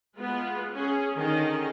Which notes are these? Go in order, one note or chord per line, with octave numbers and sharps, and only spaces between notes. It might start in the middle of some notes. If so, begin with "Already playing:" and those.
G#3 B3 F4 B4
C#4 G#4
D3 D#3 C#4 G#4 D#5